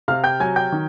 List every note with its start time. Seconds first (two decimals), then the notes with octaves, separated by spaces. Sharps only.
0.08 C3 F5 F6
0.24 G5 G6
0.40 F#3 G#5 G#6
0.56 G5 G6
0.72 D#3